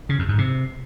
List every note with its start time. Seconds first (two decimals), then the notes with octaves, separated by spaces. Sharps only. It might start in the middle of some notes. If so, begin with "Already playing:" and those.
0.09 C#3
0.19 F2
0.29 G#2
0.38 C3